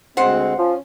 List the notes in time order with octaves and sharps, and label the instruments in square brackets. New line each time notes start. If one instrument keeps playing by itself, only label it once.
[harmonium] D2 G#3 C4 [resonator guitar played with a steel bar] C5 F#5
[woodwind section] F3 [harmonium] C#4